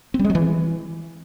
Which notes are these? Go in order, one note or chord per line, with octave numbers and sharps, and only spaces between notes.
C4
G3
G#3
F#3
E3